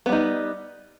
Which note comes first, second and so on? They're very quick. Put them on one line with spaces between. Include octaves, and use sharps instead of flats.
B3 G3 D#4